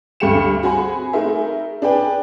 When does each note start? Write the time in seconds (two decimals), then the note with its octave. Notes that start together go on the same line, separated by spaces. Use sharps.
0.20 D2 G2 A3 G4 C#7 E7
0.63 C4 F#4 G#4 G#5 B5
1.13 A3 D#4 G#4 A#4 E5
1.82 D4 G#4 B4 G5